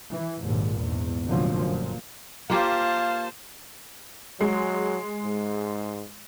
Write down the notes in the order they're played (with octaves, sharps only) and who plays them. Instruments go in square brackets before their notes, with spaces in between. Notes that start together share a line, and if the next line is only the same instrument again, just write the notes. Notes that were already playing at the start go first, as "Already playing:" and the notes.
[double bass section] E3
A#1 D#2 G#2
E2 G#2
F1 F#2 A#2 D3 F3
A#2
[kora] A#3 F4 G4 [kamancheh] C5 A5 [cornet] F5
[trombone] F#3 [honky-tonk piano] G#3
[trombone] G#2